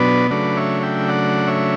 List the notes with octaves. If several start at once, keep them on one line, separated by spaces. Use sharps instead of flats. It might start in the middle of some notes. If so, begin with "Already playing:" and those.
Already playing: B2 F#3 B3 D4 B4 D5
C#3 F#3 A3 D4 B4 D5
C#5 E5
E5 G5
D5 F#5
C#5 E5